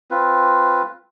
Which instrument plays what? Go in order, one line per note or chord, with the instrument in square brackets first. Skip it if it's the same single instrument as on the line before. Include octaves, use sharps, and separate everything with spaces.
[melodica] C4 F4 B4